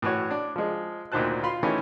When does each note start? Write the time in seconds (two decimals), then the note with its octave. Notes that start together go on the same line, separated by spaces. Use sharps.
0.02 A2 E3 F#4 C#5
0.31 D4
0.56 F3 G#3
1.12 D2 A#2 D#3 C5 A5 F#6
1.43 F4 B5 C6
1.63 D#3 E3 A3 C#4